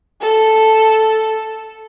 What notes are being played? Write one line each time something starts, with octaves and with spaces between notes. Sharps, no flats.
A4